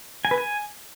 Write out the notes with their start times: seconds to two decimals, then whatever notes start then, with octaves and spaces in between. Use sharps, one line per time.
0.25 G#5
0.31 B4
0.38 G#5